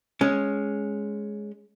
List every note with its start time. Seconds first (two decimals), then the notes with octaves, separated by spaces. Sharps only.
0.21 G#3 C#4